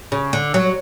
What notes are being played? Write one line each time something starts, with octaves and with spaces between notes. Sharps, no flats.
C#3
D3
F#3